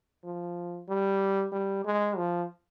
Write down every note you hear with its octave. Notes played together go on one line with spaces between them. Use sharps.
F3
G3
G3
G#3
F3